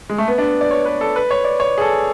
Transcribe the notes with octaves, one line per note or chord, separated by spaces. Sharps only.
G#3
A3
B3
D4
D5
C#5
B4
A4
B4
C#5
D5
C#5
G#4
A4